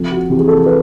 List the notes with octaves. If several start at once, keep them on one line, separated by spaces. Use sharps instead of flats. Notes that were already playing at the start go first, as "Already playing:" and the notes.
Already playing: F2
F#4
C3 E3 G4
G#4
A4
B4